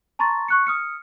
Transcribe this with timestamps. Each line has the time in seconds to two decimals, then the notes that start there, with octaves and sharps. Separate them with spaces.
0.19 A5 A#5 C6 C#6 A6
0.48 C#6 F#6 C#7
0.67 D#6 F6 C#7